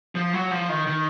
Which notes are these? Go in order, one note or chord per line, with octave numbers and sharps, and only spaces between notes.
F3
F#3
F3
D#3
D#3